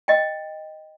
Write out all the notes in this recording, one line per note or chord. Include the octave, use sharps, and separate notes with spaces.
D#5 G5